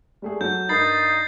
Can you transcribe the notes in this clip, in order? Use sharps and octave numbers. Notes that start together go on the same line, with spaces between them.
G3 A3 G#4
F#3 A4 G6
G2 D#4 A#4 B5 A6 C7